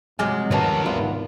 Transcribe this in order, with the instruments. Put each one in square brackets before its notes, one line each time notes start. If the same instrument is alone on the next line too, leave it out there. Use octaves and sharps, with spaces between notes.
[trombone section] F2 F#3 [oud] C3 G#3 [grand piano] G#5 D6 F6
[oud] B2 D#4 [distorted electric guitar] D#3 A#3 [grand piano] B4 A5
[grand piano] G#1 [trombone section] C3 E3 B3 [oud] F4